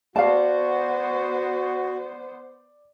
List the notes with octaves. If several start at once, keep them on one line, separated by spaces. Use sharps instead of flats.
B3 F#4 C5 D5 F5 A5